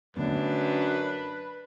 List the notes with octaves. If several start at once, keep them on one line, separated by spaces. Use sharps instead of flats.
F#2 D3 A3 B3 D4 B4